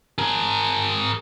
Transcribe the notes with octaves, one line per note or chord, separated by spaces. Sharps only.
G#4 A#4